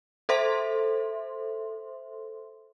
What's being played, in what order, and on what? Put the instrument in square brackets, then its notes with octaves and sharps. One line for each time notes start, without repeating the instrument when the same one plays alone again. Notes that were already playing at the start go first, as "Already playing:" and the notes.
[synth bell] A4 C5 E5 C6